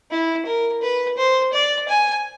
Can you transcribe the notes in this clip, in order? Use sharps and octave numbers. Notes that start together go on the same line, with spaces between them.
E4
A#4
B4
C5
D5
G#5